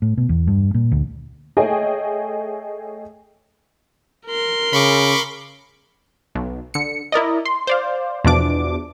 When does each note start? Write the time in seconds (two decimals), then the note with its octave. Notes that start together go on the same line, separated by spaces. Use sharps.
0.02 A2
0.18 B2
0.29 E2
0.47 G2
0.74 A#2
0.92 D2
1.57 A3 G#4 C#5 D#5 G5 G#5
4.26 A#4 C6
4.73 C#3 B5 C#6 D6
6.35 B1
6.74 D3 C#7
7.12 E4 A#4 D5 D#5
7.45 C6
7.67 C5 D5 F5
8.25 E2 B2 F3 D4 D6